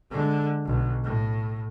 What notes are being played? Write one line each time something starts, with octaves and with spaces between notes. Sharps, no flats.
D3 G#3
B1
A2